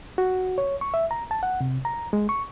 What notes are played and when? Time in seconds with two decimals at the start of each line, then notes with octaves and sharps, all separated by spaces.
0.18 F#4
0.58 C#5
0.81 C#6
0.94 E5
1.11 A#5
1.31 A5
1.43 F#5
1.61 C3
1.85 A#5
2.13 G#3
2.29 C#6